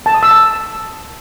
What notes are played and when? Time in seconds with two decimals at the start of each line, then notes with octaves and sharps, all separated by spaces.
0.06 A5
0.14 D#6
0.23 E6
0.31 A5